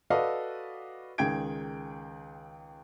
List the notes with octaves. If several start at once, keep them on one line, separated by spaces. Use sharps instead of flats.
F#4 A4 B4 D5 D#5 F5
C#2 D#3 G#4 G5 G#6 D7